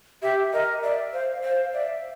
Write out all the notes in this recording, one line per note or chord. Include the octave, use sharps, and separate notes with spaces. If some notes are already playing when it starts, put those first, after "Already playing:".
G4 E5
A#4 D#5
D5 E5
C5 F5
C5 F5
D5 E5